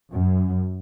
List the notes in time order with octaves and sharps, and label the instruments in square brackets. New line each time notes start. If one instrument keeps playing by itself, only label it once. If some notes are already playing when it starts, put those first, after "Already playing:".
[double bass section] F#2